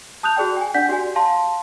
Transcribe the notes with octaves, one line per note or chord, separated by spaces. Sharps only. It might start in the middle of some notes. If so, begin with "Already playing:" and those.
A5 D#6 F#6 G6 F7
F#4 G#4 D5 G5
G5 G#5
D4 D5 F#5 G6 B6
F#4 G4 D5 G#5
F5 A5 C6